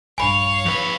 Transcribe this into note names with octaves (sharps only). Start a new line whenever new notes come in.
A#1 G2 C#5 F5 G#5 B5
F2 B4